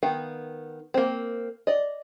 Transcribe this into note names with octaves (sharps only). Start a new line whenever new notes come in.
D#3 B3 F5 G5
A#3 C4
D5 D#5